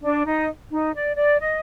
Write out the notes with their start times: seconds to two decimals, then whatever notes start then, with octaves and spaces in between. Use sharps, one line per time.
0.02 D4
0.25 D#4
0.71 D#4
0.94 D5
1.16 D5
1.40 D#5